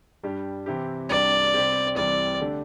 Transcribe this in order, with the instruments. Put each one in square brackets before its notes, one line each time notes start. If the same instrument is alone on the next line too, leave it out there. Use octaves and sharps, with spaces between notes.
[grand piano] G2 G3 D4 G4
C3 E3 C4 E4 G4
[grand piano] C2 C3 G3 D4 [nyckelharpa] D5
[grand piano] C3 G3 C4 G4
[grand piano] C2 C3 E3 G3 C4 [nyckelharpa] D5
[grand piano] D3 A3 D4 G4